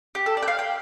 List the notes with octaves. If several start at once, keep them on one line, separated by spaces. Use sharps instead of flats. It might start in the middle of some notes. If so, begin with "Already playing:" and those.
G4
A4
D5
G5
F5
G5